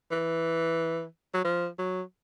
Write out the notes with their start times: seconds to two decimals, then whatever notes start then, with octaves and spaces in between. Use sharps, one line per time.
0.11 E3
1.34 F#3
1.45 F3
1.78 F#3